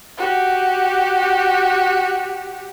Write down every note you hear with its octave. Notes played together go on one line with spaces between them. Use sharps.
F#4 G4